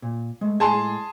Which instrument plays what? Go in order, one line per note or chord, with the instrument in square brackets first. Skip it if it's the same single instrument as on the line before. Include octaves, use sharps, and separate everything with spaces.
[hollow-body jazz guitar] A#2
G#3 A3
[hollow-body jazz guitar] A2 G#3 G#5 [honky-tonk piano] G#4 A5 C6